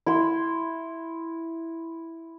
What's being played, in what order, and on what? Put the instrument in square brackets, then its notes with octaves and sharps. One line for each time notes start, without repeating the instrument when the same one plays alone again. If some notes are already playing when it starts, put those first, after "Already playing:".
[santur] E4 C6